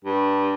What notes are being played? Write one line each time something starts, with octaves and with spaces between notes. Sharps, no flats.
G2